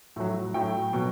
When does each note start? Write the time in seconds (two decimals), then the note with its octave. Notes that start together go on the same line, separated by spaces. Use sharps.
0.16 A2 F#3
0.54 A2 F#3 G5
0.93 B2 F#3